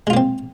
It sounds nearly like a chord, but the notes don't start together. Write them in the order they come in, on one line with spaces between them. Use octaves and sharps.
G#3 F4 A#3 C4